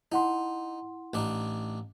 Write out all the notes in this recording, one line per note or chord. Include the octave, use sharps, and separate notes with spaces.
D#4 E4 F#5 C6
A1 D4 D#4